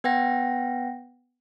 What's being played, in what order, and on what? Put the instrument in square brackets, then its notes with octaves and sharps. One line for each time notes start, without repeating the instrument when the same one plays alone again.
[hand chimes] B3 B4 F#5 G5 A#6